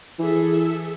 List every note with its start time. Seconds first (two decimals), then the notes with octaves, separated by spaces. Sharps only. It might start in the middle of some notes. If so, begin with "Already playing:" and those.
0.19 E3 G#4 A4 E5